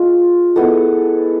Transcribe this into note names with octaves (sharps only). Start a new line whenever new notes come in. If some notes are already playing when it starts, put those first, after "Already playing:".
Already playing: G#3 F4
G#3 B3 E4 A4